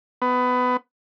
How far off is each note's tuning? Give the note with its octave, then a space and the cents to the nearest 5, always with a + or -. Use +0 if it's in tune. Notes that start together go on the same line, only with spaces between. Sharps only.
B3 +20